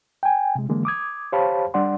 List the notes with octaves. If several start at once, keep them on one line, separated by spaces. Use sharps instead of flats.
G5 G#5
C3 G#3
D3 E3 G#3 A#3
D6 D#6 G#6
G4 C5 C#5 F5 A5 B5
G3 D4 D5 F#5 C6